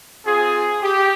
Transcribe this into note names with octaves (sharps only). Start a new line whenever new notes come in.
C4 F4 G#4
G4